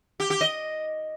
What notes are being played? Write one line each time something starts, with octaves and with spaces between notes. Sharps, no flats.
G4
G4
D#5